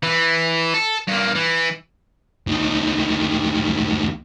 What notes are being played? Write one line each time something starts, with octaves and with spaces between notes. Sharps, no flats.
E3
A4
G2 A#3
E3
D2 D#3